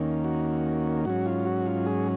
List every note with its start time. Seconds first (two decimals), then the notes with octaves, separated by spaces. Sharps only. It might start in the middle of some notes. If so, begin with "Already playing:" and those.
Already playing: D#2 D#3 A#3 C#4
0.24 F#4
1.05 G#2 F#3 C#4 F#4
1.26 F4
1.46 F#4
1.66 F4
1.86 G#4